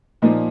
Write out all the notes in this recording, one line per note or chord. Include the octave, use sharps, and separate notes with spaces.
A#2 F3 A#3 D#4